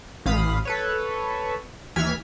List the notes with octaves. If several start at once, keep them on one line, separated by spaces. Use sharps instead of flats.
A1 F5 B5 D#6
A4 B4 C#5
D#2 E3 F6 G#6 B6